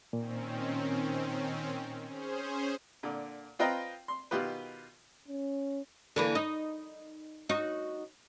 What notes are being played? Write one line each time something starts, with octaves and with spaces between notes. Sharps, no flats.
A#2 D#3 C4 C#4
C#4 G#4 C5
A#2 D3
C4 F4 B4 D#5 G5 A#5
C6
B2 D#3 F4 G4 B4
C#4
D3 E3 A#3
D#4
D#4 F#4